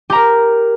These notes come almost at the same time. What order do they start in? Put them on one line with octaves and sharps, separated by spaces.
G4 A#5 A#4